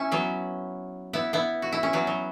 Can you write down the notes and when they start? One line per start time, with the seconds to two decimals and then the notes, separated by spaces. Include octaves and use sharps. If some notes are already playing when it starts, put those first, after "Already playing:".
Already playing: C#4 E4
0.12 F#3 B3
1.13 B3 E4
1.33 B3 E4
1.62 F#4
1.72 E4
1.83 C#4
1.93 F#3 B3
2.07 F#3